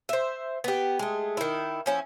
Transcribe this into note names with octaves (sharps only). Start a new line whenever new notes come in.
C5 E5
B3 G4
G#3 A3
D#3 E4
F3 C#4 E4